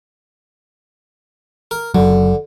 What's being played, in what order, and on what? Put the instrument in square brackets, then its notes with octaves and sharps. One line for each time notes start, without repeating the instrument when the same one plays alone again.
[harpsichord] A#4
[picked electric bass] F#1 F#3 [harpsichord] D3